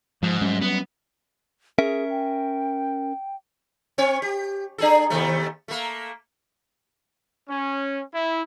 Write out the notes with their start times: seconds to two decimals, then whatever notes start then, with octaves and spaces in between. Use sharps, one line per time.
0.23 G#2 F3
0.41 F#3 G3 C#4
0.62 B3
1.79 C#4 G#4 A#4 E5
2.10 G5
3.98 C4 C#5
4.22 G4
4.78 D4 G#4 A4
5.10 D#2 C3 A3
5.68 A3 A#3
7.47 C#4
8.12 E4